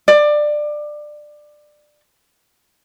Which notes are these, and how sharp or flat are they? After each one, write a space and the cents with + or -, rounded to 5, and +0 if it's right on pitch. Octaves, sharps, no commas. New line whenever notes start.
D5 +20